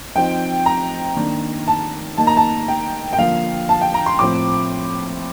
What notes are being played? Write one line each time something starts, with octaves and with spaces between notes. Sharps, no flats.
F3 C4 D#4 G5
A#5
D#3 A#3 D4
A5
D#3 A#3 D#4 A5
A#5
A5
G5
G5
D3 F3 A#3 F5
A5
G5
A#5
C6
A2 F3 C4 D6